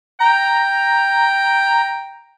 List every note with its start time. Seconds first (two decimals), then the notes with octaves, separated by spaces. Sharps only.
0.20 G5 A#5